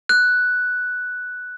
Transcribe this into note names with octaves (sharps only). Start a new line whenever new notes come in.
F#6